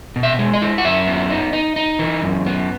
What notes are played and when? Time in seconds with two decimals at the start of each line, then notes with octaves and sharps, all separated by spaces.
0.16 B2
0.23 E5
0.39 G#3
0.54 D#5
0.62 E4
0.78 F#5
0.84 F#2 E5
1.07 B3
1.30 D#4
1.53 D#4
1.76 D#4
1.99 E3
2.22 F#2
2.46 B3